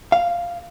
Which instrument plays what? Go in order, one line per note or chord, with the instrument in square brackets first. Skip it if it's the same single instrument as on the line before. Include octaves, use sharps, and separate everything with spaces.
[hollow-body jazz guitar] F5